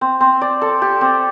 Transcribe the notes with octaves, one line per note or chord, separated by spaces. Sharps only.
C4
C4
D5
A4
G4
C4